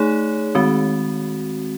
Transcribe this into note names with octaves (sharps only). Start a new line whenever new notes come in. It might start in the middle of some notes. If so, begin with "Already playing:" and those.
Already playing: A3 D#4 G#4 C#5
D#3 G#3 C4 F#4